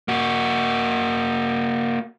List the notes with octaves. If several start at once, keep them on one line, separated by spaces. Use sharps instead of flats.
A#3 F#4